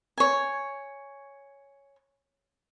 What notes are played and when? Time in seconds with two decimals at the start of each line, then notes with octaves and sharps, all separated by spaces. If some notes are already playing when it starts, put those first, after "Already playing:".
0.18 C#5 G#5